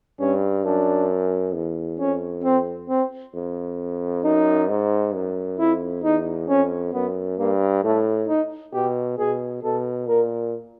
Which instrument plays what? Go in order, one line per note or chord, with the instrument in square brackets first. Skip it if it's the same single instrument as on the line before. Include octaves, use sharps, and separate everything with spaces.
[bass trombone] G2 [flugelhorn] C#4
[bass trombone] F#2 [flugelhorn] D4
[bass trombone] E2
[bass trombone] F2 [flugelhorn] C#4
[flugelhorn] C4
C4
[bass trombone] F2
[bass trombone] F#2 [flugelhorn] D#4
[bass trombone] G#2
F#2
[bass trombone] F2 [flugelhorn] E4
[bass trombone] E2 [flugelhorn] D#4
[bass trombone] F2 [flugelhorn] C#4
[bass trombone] F#2 [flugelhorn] B3
[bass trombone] G2 [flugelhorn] A#3
[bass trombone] A2 [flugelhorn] A3
[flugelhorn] D#4
[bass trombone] B2 [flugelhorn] G4
[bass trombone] B2 [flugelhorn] G#4
[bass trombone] B2 [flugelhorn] A4
[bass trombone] A#2 [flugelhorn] A#4